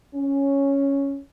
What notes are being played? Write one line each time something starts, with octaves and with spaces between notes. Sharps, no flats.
C#4